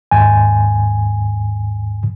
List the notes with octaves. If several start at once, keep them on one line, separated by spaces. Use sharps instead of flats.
D#2 G#2 G#5